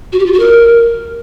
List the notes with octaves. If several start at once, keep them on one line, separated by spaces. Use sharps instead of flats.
F#4
G4
F4
F#4
A#4